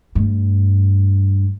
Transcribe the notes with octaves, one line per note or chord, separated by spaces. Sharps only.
G2 A3